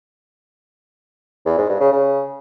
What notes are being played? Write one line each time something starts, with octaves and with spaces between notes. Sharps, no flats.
E2
G#2
G2
C#3
C#3